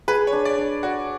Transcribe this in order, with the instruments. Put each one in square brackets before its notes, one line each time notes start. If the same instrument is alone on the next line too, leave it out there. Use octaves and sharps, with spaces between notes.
[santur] G#4 [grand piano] B4
[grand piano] C#5
[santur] D4
[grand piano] D5
[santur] D4
[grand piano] F#4 [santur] D5